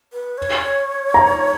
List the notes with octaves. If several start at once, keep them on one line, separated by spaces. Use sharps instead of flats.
B4
C#5
A#5